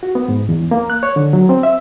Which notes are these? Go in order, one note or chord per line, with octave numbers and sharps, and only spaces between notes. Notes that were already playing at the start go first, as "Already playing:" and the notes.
F#4
B3
G#2
E2
A#3
F#6
C#5
D3
F#3
C4
E5